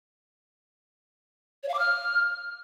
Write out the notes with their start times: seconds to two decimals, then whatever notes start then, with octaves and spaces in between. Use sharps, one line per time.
1.63 C#5
1.69 F5
1.74 D6
1.79 F6